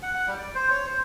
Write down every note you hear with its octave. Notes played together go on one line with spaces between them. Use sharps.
F#5
F#5
G3
D5
C5
C#5
C5